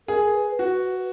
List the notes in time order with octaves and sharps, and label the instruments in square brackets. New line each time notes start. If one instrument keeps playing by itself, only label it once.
[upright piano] G#4 [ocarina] A#4
[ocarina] B4
[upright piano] F#4 [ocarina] B4